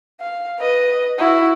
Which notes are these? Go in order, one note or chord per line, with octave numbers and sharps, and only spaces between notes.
F5
B4 D#5
E4 F#4